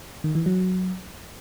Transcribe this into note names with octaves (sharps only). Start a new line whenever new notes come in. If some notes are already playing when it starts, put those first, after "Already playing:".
D#3
E3
F#3